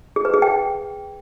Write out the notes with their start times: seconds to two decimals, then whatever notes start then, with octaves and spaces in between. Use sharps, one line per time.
0.16 G#4
0.25 B4
0.34 G#4
0.42 G5